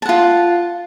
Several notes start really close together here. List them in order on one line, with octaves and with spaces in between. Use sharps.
A5 F#5 F4